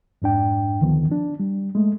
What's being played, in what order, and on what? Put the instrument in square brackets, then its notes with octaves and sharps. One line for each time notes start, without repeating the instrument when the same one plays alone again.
[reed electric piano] F2 G#2 D4 G5
D2 D3 D#3 F3 B3
D4
G3
G#3 A3